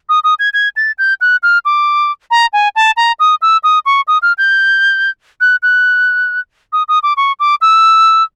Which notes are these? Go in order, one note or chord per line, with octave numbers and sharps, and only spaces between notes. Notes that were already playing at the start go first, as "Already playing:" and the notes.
D#6
D#6
G#6
G#6
A6
G6
F#6
F6
D6
A#5
G#5
A5
A#5
D#6
E6
D#6
C#6
D#6
F6
G6
F#6
F#6
D#6
D#6
D6
C#6
D6
E6